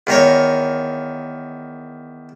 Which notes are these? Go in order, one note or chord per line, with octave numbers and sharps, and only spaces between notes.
E2 D#3 A#4 C#5